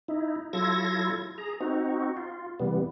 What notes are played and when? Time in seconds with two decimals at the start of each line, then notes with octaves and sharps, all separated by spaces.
0.08 D#4 E4
0.53 F#3 E4 F4 A4 G#6 A#6
1.38 G#4 A#5
1.61 C4 D#4 F#4
2.17 F4
2.59 C3 E3 G3 B3